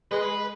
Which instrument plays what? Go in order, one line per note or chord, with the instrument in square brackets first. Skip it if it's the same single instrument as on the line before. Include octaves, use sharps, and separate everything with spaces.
[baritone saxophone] G#3 [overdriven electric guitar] B4